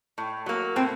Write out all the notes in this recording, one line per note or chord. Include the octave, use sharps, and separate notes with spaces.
A2
F#3 A#3
A2 C4